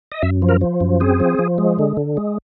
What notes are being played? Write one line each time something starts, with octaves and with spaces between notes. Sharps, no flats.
D#5
F#2 E5
F3
A#4
F3
F#2
C4 G#4
F3
F3
G#3
D3
D3
G#3